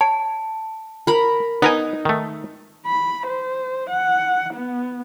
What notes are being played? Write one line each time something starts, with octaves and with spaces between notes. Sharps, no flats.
C#5 A5
A#4 B5
B3 D#4 A#4 G#5
D#3 A3
B5
C5
F#5
B3